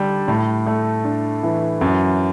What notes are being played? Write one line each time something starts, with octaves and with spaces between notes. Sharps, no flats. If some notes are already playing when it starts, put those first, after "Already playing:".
Already playing: D3 G3 D4
A2
A3
D4
E3
F#2